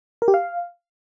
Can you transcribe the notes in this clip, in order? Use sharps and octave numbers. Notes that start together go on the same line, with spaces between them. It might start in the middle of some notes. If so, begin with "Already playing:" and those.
A#4
G4
F5